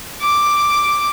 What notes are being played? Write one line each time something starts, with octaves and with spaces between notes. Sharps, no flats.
D6